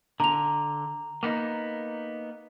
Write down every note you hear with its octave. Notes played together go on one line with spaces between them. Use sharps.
D3 A#5 F7
A#3 B3 D#4